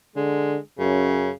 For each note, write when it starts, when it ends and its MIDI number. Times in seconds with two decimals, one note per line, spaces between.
0.16 0.57 50
0.16 0.60 56
0.79 1.29 42
0.79 1.31 49